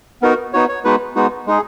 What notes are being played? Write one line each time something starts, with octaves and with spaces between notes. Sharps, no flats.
B3 D#4 F#4 A#4
B3 D#4 F#4 C#5
C#5
G#3 B3 D#4 F#4 B4
G#3 B3 D#4 F#4
G#3 D#4 G#4